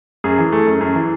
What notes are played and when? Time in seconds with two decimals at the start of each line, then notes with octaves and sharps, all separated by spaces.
0.24 F#2 G#4
0.39 E3
0.52 A3
0.67 F#2
0.81 F#2
0.95 E3